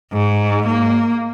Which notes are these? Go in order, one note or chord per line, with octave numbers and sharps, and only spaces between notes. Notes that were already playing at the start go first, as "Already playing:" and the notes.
G#2
A#3